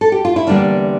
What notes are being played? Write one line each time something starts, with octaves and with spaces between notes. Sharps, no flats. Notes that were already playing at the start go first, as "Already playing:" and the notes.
A4
G4
F4
E4
E2 D3 G3 A#3 D4